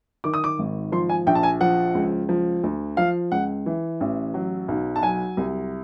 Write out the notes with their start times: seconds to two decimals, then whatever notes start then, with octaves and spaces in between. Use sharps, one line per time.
0.24 D#3 D6
0.34 D#6
0.44 D6
0.59 G#1
0.92 F3 C6
1.09 G#5
1.27 A#1 G5
1.35 A5
1.43 G#5
1.61 F3 F#5
1.95 C#2
2.29 F3
2.63 D2
2.97 F3 F5
3.32 C#2 F#5
3.66 E3
4.01 A1
4.34 F#3
4.68 B1
4.96 A5
5.02 F#3 G#5
5.37 C2